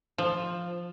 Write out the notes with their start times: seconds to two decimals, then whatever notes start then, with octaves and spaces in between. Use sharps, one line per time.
0.18 F3